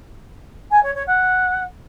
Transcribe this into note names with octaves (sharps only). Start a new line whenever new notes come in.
G#5
C#5
C#5
F#5